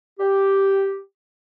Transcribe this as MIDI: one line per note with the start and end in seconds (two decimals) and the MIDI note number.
0.19 0.98 67